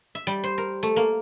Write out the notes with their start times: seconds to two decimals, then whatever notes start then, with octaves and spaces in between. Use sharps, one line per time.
0.15 E5
0.27 G3
0.44 C5
0.58 A#4
0.83 A3
0.96 A#3